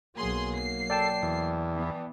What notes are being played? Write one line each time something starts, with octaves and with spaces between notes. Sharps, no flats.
B1 F#3 A#3 G#4 C6
C7
A4 D5 G5 A5
E2
E3 B3